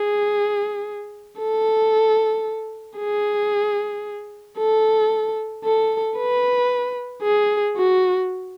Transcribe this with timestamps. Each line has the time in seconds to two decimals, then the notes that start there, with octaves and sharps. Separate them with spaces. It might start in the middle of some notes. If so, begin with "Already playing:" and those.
Already playing: G#4
1.39 A4
2.98 G#4
4.58 A4
5.64 A4
6.18 B4
7.23 G#4
7.77 F#4